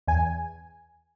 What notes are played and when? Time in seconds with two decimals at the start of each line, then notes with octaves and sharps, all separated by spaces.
0.07 E2 G#5